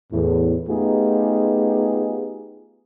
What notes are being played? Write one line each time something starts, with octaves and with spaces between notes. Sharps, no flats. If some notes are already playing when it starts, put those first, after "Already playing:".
E2 A2
A3 B3 D#4 F4 G4 G#4